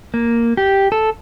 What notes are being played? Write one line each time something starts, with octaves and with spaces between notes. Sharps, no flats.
A#3
G4
A4